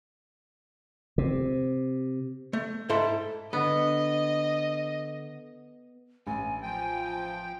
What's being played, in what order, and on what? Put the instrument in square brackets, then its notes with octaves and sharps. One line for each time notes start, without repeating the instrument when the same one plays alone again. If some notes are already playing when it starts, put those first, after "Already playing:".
[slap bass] C3
[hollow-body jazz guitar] A3
G#2 E4 A4 E5 C6
[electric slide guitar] D3 [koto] B3 [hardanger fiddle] D#5
[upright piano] A1 [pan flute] G#5
[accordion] F3 G5